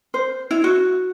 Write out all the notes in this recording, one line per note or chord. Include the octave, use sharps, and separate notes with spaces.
C5
E4
F#4